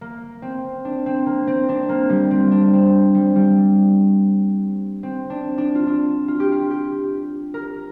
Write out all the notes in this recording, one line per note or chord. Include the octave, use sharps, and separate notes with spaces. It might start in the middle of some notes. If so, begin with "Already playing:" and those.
A#3
C4
D4
C4
A#3
C4
D4
A#3
G3
C4
D4
C4
G3
G3
C4
D4
D4
F4
D4
F4
G4
F4
G4
A#4